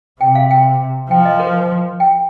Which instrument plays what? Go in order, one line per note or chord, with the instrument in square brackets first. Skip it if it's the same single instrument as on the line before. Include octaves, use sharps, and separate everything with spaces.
[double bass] C3 [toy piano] G5
[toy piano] F5
G5
[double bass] F3 [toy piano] G5
[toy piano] D#5
A#4
G5